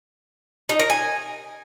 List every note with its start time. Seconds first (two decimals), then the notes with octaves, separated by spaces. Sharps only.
0.69 D#4
0.79 A#4
0.90 G#5